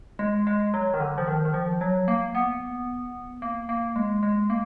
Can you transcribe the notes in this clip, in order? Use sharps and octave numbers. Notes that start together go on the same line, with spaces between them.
G#3
G#3
F#3
D#3
D3
F3
D#3
D#3
F3
F#3
A#3
B3
A#3
A#3
G#3
G#3
A#3